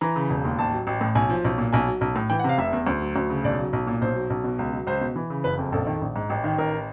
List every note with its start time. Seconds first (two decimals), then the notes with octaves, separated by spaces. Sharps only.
0.01 E3 A#5
0.16 C#3
0.30 E1
0.44 D#2
0.59 A1 A5
0.73 F#3
0.87 A1
1.01 A2
1.15 B1 G#5
1.29 F3
1.44 B1
1.58 A#2
1.73 B1 G#5
1.88 F#3
2.01 B1
2.16 A2
2.30 E3 G5
2.39 F#5
2.44 C3
2.49 F5
2.58 F1 E5
2.73 E2
2.87 D2
3.02 F#3
3.16 D2
3.30 C#3
3.44 B1 D5
3.58 F#3
3.73 B1
3.87 A#2
4.01 B1 C5
4.16 F#3
4.30 B1
4.44 B2
4.59 C#2
4.73 F#3
4.87 C#2 C5
5.01 B2
5.16 E3
5.30 C#3
5.44 F#1 B4
5.58 F2
5.72 A#1 A4
5.87 D#3
6.02 A#1
6.16 G#2
6.30 A1
6.44 D#3
6.58 A1 A#4